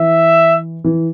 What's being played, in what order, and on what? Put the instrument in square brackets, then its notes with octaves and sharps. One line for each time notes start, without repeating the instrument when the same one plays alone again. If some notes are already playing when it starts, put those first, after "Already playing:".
Already playing: [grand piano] E3 [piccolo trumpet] E5
[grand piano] E3